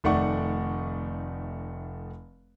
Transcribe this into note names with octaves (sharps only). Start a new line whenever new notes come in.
F1 D#3 A3 D5 F#5 C#6